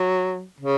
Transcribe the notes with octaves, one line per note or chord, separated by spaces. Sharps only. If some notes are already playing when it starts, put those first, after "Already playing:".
Already playing: F#3
C#3